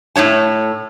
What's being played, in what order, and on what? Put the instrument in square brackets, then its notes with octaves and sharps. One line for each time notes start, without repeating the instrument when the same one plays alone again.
[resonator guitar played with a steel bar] A2 D4 C#5 A5